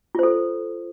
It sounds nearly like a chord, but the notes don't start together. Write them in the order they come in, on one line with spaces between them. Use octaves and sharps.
F4 C5 A4